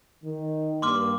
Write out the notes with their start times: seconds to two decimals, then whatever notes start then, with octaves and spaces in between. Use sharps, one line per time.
0.24 D#3
0.82 G2 A#3 C6 D6 F6